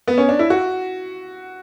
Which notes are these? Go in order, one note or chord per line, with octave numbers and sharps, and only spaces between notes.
B3
C#4
D4
E4
F#4